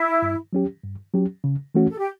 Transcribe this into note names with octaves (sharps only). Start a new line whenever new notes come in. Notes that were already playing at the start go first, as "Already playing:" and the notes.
Already playing: E4
G2
F#3 C#4 G4
G2
F#3 C#4 G4
C#3
E3 A3 C#4 F#4
A4
G4